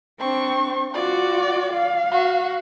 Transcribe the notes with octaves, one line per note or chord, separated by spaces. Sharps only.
C4 D4 C#6
F4 F#4 D5
F5
F#4